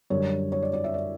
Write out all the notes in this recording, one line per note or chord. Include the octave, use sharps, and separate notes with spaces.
F#2 D3 G3 C#5
C#5
D5
D5
E5
D5